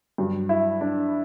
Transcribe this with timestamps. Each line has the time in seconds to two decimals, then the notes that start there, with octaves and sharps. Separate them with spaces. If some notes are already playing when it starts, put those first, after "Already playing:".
0.18 G2 F#3
0.49 E4
0.81 D4